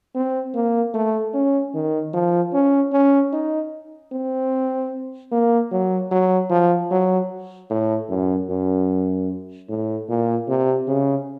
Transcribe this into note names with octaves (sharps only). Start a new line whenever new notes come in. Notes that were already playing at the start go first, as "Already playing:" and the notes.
C4
A#3
A3
C#4
D#3
F3
C#4
C#4
D#4
C4
A#3
F#3
F#3
F3
F#3
A2
F#2
F#2
A2
A#2
C3
C#3